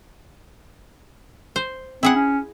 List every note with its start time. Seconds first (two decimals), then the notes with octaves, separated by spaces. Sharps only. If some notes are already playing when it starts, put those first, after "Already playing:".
1.56 C5
2.03 C4 E4 G#4 F#5
2.15 C#4